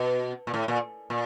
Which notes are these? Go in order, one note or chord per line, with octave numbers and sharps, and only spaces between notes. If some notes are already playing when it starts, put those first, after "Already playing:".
Already playing: B2
A#2
A2
A#2
A#2